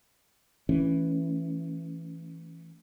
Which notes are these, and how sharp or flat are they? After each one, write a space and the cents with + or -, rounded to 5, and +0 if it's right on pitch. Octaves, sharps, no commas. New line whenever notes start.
E3 +0 A3 +0 C#4 +0